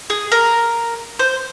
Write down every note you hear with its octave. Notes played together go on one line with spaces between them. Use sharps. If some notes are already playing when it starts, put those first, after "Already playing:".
G#4
A#4
C5